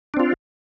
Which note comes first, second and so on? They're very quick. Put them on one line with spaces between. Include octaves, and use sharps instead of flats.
D4 C4 F4